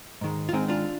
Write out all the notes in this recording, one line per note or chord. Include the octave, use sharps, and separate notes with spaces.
G#2 D#3 G#3
F4
G#2 D#3 G#3 C4 D#4
D4 F4